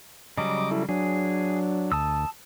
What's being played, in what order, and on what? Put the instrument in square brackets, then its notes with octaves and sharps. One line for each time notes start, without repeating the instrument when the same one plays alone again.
[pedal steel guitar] C#3 F#3 G3 [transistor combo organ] D#5 D6
[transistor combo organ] E4 A4
[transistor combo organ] F#3 D4 [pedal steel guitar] G#4
[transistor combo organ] D2 [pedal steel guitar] A5 D#6 E6